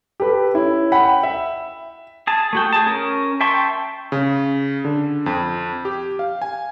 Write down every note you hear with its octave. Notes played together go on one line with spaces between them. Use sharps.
G4 A4 B4
C#4 E4
F#5 G5 B5
E5
G#4 A5
A3 F#4 G5
G#4 A5
C#4 A#4
E5 G5 A5 C6 C#6
C#3
D3
F2
G4
F5
G#5